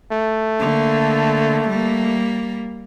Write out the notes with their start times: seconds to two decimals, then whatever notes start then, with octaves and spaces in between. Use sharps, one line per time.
0.12 A3
0.59 D3 A#3
1.69 G3 A#3